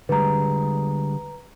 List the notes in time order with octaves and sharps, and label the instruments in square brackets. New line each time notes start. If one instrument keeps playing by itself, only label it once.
[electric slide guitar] D3 G3 G#3 [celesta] B4 A#5